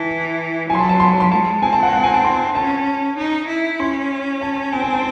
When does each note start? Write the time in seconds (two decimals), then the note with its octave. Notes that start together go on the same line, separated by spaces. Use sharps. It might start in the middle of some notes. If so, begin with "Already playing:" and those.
Already playing: E3 A5
0.69 F#3 G#5
0.75 C6
0.79 A5
0.89 A5
1.00 C6
1.20 C6
1.31 G#3 A5
1.62 C4 G#5
1.73 A5
1.83 F#5
1.93 F#5
2.03 G#5
2.14 A5
2.24 C6
2.55 C#4 A5
3.18 D#4
3.48 E4
3.79 C#4 C6
4.41 A5
4.72 C4 G#5
4.82 G#5
4.94 A5